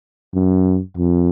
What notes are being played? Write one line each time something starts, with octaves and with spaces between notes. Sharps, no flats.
F#2
F2